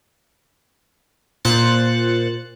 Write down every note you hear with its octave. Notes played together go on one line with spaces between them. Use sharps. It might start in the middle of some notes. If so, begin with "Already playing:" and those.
A#2 C5 F#6 A6 C#7